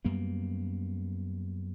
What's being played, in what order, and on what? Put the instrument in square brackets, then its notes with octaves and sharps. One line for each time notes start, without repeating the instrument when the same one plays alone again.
[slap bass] F#2 G3 A#3 B3